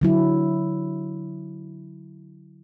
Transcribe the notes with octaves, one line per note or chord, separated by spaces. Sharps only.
D3 F#3 E4